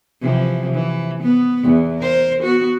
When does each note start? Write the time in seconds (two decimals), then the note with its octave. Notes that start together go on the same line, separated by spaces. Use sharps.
0.21 C3 E3 F3
0.73 E3
1.22 B3
1.62 E2
1.98 A#4 C5
2.42 B3 F#4